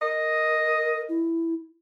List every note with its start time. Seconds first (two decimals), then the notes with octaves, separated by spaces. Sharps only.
0.02 A#4 D#5
1.09 E4